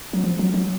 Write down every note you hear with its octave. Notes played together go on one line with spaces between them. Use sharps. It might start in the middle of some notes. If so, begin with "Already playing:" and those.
F#3
F3
F#3
F#3